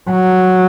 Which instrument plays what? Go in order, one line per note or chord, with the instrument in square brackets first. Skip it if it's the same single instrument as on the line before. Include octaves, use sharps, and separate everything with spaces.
[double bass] F#3